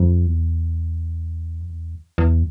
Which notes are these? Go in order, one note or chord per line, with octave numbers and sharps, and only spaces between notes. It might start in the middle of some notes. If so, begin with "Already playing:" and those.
Already playing: F2
E2
F2
E2
E2